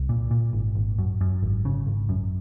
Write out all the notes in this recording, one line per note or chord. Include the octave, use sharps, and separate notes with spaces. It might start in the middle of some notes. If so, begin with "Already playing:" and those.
Already playing: C2
A#2
A#2
G#1
G#1
F#2
F#2
G#1
C#3
G#1
F#2